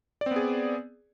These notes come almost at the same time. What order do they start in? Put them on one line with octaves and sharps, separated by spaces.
D5 C4 B3 G#4